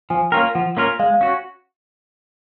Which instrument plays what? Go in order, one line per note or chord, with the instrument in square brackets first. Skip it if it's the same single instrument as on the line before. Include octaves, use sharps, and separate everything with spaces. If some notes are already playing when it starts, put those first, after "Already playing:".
[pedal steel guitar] F3 [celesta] G#5
[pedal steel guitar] A#3 C#4 F4 A#4 [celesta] G5
[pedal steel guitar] F3 [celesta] F#5
[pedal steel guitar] A#3 C#4 F4 A#4
[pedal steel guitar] G#3 [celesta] F5
[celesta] F5
[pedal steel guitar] C#4 F#4